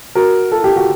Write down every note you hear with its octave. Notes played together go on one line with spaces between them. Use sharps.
F#4 A#4
F4 A4
E4 G4
F4 F#4